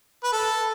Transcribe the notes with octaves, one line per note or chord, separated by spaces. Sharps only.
B4
A4